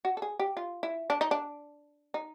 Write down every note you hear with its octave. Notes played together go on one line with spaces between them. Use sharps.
F#4
A4
G#4
G4
F4
E4
D4
D#4
D4
D#4